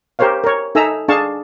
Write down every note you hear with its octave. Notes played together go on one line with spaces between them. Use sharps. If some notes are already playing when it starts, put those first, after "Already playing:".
G4 A#4 C5 C#5 F5
A#4 C#5
D#4 A4 E5 G#5 A#5 E6
D4 G#4 F5 A5 C#6